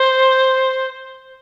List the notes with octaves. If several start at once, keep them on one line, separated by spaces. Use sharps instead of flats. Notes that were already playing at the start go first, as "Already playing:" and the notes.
Already playing: C5